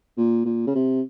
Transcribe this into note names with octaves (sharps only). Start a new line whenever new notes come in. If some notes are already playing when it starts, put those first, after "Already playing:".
A#2
A#2
C#3
C3